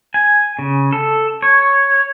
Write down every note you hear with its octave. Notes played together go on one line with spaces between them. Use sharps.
G#5
C#3
A4
C#5